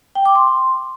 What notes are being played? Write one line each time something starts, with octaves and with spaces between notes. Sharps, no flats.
G5
D6
C6